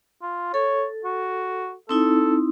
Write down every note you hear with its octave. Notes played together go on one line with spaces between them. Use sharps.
F4
A4 C#5
F#4
C4 D#4 E4 A4